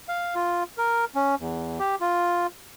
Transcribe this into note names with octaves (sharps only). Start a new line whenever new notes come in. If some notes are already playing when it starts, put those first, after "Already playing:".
F5
F4
A#4
C#4
E2
G4
F4